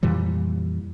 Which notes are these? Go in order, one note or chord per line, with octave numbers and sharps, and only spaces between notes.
F2 A#2 E3 G3